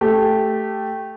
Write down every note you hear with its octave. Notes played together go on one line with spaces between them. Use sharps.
A3 G4